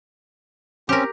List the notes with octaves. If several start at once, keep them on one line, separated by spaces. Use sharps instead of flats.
C4 C#4 G4 A#4